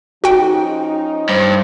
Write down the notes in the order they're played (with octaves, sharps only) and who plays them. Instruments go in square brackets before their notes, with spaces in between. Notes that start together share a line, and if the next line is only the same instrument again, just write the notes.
[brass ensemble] F3 C#4 D#4 [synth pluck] F#4 G5
[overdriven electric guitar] G2 [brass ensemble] C5